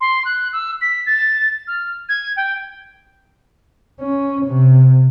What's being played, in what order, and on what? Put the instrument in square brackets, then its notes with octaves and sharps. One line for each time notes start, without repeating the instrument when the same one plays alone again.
[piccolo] C6
F#6
E6
B6
A6
F6
G#6
G5
[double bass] C#4
C3